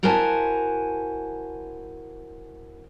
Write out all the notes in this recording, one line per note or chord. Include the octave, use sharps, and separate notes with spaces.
E4 F#4 A#4 C5 G#5 A5